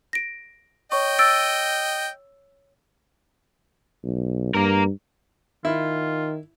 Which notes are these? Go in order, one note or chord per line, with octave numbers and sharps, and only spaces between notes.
A#6 D7
C#5 D#5 G5 C#6
E6 A6 D7
B1
G2 A#3 A#4
D#3 E4 F4